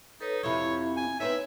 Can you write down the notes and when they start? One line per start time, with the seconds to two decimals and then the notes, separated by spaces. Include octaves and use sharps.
0.21 D#4 A4 B4 C#5
0.43 F2 C3 E4 C#5 E5 B5
0.97 G#5
1.20 B3 C4 D#4 C#5 E5